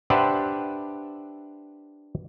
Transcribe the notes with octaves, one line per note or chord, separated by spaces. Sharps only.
D4 G4 B4 C5 E5 F#5